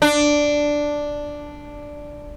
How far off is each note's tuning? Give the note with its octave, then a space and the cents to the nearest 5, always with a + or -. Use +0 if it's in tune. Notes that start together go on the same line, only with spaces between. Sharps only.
D4 +0